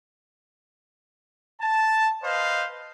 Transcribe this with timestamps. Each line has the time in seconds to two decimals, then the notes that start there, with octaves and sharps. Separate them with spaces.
1.61 A5
2.23 B4 C5 D#5 F5